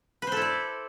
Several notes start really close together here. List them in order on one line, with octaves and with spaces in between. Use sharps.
B4 C5 A4 E4 D5